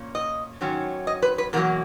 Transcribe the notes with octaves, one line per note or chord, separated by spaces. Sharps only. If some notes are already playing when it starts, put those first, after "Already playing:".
Already playing: A#2 A#3 C#4
D#5
G#2 D#3 F#3 C#4
D#5
B4
B4
E2 B2 F#3 A#3 A#4